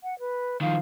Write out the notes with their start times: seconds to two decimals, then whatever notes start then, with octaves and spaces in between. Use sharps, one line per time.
0.04 F#5
0.19 B4
0.61 D#3 F3 F5